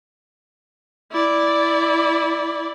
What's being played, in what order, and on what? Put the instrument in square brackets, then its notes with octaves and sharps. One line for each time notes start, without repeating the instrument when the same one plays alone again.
[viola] E4 D5